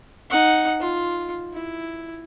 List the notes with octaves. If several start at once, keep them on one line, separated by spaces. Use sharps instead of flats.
D#4 F#5
F4
E4